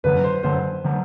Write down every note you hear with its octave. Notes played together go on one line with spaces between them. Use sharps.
F#2 D3 F#3 B4
C5
F#2 D3 F#3 C5
D3 F#3